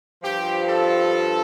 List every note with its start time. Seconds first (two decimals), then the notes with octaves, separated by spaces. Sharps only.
0.22 G2 F3 G4
0.66 A4